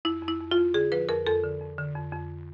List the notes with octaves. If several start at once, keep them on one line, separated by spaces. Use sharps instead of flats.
F2 E4
F2
E4
F2
F4
F2
D3 G#4
F3 B4
F2 A#4
F2 A4
D3
F2
D3
F2
F2